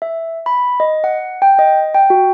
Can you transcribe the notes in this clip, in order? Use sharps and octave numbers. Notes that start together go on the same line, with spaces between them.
E5
B5
D#5
F#5
G5
D#5
G5
F#4